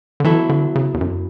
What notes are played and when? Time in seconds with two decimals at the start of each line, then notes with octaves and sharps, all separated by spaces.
0.20 D3
0.24 E3 F#3 B3 E4 A4
0.49 D3
0.75 C#3
0.94 E2
1.01 F#2